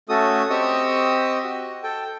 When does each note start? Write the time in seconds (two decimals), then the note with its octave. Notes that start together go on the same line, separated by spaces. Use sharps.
0.09 A3 C#4 F#4 A4 D#6
0.50 C4 G4 D#5 C#6 D#6 E6
1.44 F#4
1.84 A4 G5